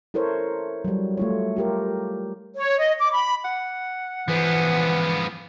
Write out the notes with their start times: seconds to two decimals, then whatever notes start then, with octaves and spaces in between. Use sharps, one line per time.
0.14 E4 A4 A#4 C5 C#5
0.85 F#3 G3
1.17 A3 F4 C#5
1.57 F4 G4 A#4
2.55 C#5
2.79 D#5
3.00 D6
3.12 B5
3.45 F#5
4.28 E3 F3 B3